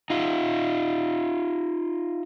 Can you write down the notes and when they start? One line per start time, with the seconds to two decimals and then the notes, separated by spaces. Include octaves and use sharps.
0.10 D#4 F4